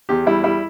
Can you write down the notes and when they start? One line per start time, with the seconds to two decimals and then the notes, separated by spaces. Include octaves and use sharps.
0.09 E2 G4
0.26 G3 E4
0.43 G3 E4